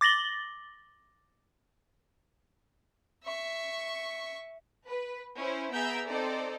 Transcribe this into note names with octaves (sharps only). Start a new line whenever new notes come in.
D6 A6 A#6 F#7 G7
E5 C#6
B4
C#4 E4 C5
B3 G#4 E5 A#5 G6 D7
C4 D#4 A4 C5 D5